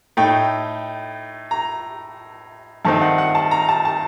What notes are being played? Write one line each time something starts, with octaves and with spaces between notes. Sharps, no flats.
A2 A3 D#4 G5
A#5
G2 D#3 A3 C4 D#4 A5
F#5
F#5
A5
A#5
A5
A5